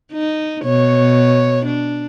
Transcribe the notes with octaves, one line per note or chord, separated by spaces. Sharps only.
D#4
B2 C#5
D4